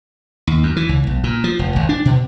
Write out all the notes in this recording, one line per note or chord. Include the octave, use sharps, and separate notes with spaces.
D#2
F#2
E3
C#2
B1
A#2
F3
F1
G#1
D4
B2